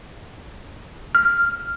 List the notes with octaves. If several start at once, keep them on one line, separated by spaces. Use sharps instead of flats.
F6